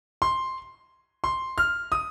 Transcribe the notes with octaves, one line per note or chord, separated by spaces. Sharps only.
C6
C6
F6
D#6